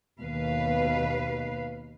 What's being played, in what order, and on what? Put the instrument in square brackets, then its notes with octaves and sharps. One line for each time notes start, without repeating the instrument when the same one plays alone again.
[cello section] D#2 B2 B4 F5